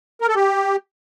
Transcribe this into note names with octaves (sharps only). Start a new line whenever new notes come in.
A#4
A4
G4